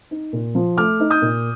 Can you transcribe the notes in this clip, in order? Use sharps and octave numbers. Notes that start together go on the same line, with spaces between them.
D#4
A#2
F3
A3 D6 F6
D#4
D#6 G6
A#2